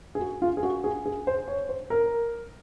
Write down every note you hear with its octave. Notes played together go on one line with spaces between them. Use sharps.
G#4
F#4
F4
G#4
F#4
G#4
G#4
C5
C#5
C5
A#4